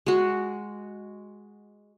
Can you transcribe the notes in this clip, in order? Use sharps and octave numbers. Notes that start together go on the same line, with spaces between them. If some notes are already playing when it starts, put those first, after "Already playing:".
G#3 F#4